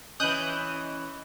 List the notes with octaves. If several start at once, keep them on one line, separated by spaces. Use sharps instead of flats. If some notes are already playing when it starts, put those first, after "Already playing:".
E3 C#4 D#5 B5 D#6 F#6 G6